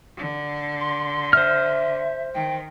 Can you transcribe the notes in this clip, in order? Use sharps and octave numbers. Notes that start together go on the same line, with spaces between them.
D3
C6
C5 E5 F6
D#3 G5